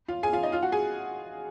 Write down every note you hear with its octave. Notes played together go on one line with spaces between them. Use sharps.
F4 F5
G#4 G#5
F4 F5
D#4 D#5
F4 F5
F#4 F#5
G#4 G#5